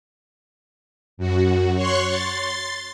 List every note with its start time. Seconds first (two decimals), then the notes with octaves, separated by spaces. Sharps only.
1.17 F#2 F#4
1.75 C#5 C6 C#6 F#6
2.07 C6 A6